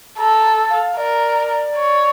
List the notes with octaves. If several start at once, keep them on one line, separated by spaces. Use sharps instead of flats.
A4 A#5
F5
A#4 D5
C#5